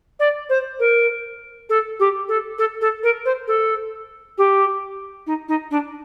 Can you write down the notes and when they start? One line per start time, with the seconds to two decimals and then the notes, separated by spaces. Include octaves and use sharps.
0.20 D5
0.49 C5
0.80 A#4
1.69 A4
2.00 G4
2.29 A4
2.58 A4
2.81 A4
3.03 A#4
3.25 C5
3.48 A4
4.38 G4
5.27 D#4
5.49 D#4
5.71 D4